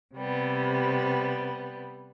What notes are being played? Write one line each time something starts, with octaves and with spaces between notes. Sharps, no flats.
C3 G3 B3